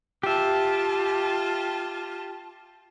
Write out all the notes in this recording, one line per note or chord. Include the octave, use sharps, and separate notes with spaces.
F4 G4 E5 A5